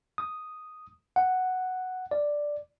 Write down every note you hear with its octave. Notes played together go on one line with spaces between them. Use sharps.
D#6
F#5
D5